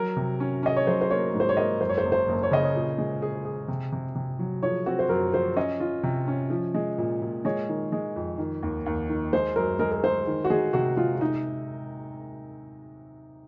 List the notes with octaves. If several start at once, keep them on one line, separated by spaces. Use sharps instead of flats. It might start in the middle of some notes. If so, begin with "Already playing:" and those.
Already playing: F#3 A#4
C3
C#4
C#4 D#5
C#5
F#3 C5
C5
A#3 C#5
G#2
C5
C#5
A#3 D#5
F#2 C5
C#5
C5
F#1
C5
F#1
C#5
C#3 D#5
C#5
A#2
G#3
G#4
G#4
C3
C3
C3
F#3
F3 C#5
C4 F#4
C5
F#2 A#4
F3 C5
C#4 D#5
F4
C3
C#4
F3
G#3
A#2
A#2
G#3 C#5
D#3
G#3
F2
D#3
D#2
D#2
D#3
G#3 C5
F#2 A#4
G#3 A#4
A#4
G#3 C5
D#3
F#4
G#3 G#4
C3 F#4
G#3 F4
D#4